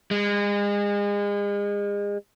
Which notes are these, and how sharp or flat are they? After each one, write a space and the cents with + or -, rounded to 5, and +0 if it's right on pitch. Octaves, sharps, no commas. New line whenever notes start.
G#3 -35